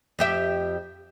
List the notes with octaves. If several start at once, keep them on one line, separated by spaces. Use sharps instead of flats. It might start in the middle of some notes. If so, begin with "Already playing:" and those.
F2 G4 E5